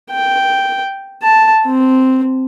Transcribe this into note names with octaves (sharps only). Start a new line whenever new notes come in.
G5
A5
C4